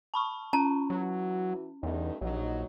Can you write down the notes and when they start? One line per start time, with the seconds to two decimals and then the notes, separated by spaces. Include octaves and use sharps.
0.14 A5 B5 C#6
0.53 C#4 A5 A#5
0.90 E3 F#3 F#4
1.83 E2 G2 A3 D#4
2.21 A#1 F#3 D#4